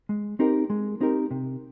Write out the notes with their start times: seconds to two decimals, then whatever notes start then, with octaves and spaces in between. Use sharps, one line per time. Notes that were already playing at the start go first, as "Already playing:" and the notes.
0.09 G#3
0.39 C4 D#4 G4 A#4
0.70 G#3
1.01 C4 D#4 G4 A#4
1.31 C3